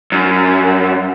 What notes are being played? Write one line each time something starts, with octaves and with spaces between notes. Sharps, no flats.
F#2